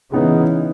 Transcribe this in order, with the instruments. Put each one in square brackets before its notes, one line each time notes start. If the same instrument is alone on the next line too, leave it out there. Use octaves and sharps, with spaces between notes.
[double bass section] C#3 E3 [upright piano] G#3 B3 D#4